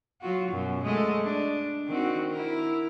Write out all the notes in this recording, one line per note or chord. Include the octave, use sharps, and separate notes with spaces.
F#3 F4 F#4
F#2 B2
G#3 A3 D#5
D4
D#3 C4 F#4
E4 A#4